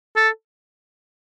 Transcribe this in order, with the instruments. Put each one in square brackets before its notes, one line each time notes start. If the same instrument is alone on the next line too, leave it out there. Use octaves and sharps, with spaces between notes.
[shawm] A4